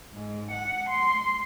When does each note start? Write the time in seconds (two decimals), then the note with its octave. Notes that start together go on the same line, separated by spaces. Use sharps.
0.11 G#2
0.49 F#5
0.88 C6